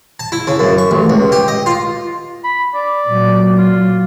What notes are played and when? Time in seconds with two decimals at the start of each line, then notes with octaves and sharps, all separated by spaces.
0.20 A5
0.32 E4
0.47 C#3
0.59 F#2
0.78 C#6
0.91 A1
1.10 C#2
1.32 G4
1.48 D#5
1.66 F4
2.44 B5
2.75 D5
3.08 A#2 F#3
3.58 F4